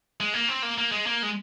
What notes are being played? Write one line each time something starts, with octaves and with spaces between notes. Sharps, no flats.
G#3
A#3
C4
A#3
A#3
G#3
A#3
G#3